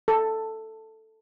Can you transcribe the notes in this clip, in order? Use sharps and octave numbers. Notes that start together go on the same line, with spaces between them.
A4